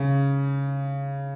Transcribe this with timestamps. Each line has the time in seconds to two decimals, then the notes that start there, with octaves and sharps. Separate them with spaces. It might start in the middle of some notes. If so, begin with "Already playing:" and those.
Already playing: C#3